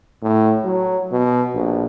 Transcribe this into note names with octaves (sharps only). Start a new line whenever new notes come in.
A2
F#3
B2
A#1